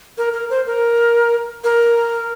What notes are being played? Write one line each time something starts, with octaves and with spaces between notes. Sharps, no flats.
A#4
A#4
C5
A#4
A#4